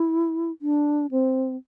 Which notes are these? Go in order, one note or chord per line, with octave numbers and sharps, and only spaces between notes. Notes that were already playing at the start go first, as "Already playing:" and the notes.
Already playing: E4
D4
C4